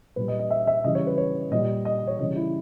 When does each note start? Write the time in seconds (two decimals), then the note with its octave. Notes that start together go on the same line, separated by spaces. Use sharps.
0.16 A#2 G3 B4
0.28 D#5
0.39 D#5
0.50 E5
0.67 E5
0.84 C#3 E3 G3 D#5
0.95 C#5
1.07 B4
1.18 C#5
1.51 A#2 G3 D#5
1.85 D#5
2.07 C#5
2.19 C#3 E3 G3 D#5
2.36 E4